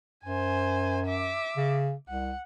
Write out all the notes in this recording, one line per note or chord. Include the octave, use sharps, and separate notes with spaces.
F#2 C5 G#5
E5 D6
C#3
C2 F#5